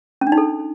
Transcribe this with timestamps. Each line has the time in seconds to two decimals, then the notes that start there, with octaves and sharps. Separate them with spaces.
0.21 C#4
0.27 D4
0.32 D#4
0.38 A4